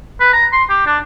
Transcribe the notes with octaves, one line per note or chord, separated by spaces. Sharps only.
B4
A#5
C6
G4
D4